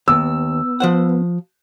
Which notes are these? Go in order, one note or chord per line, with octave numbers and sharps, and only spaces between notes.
D#2 B3 E6
F3 C5 F#5